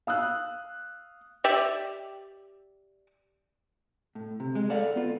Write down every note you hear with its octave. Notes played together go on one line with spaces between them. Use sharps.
F5 D#6 E6 F#6
G4 D5 E5
A2
C3
G#3
A4 D5 F5 F#5
B3 F4